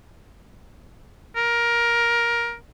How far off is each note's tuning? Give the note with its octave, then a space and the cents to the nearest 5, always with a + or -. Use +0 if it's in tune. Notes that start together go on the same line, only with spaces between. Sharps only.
A#4 +15